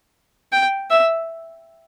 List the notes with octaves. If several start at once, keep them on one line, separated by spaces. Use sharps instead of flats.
G5
E5